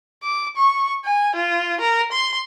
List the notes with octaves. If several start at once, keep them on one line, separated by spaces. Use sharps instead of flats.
D6
C#6
G#5
F4
A#4
C6